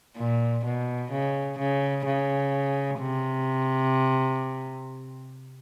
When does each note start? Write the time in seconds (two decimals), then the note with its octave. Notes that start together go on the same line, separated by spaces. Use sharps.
0.17 A#2
0.65 B2
1.12 C#3
1.58 C#3
2.06 C#3
3.00 C3